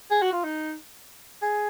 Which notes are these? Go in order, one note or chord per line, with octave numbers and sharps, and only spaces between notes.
G#4
F#4
F4
D#4
G#4